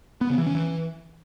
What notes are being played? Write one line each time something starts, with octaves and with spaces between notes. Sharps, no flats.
B3
C#3
E3
C#4
E3